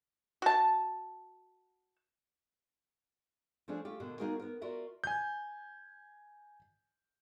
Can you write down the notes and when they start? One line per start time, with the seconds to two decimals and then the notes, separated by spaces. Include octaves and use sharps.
0.42 F#4 A5
3.68 F3 A3 C#4 D4 G#4
3.85 A3 F4 G4
4.00 B2 D3 A#3
4.19 A#3 B3 D#4 F#4 G#4 A#4
4.40 B3 A#4
4.61 F4 F#4 A#4 D5 E5
5.04 G#5 G6